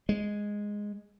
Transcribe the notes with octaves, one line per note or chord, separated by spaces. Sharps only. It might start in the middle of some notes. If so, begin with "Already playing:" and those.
G#3